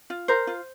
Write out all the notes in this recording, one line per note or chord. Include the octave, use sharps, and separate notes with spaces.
F4
A#4 C5
F4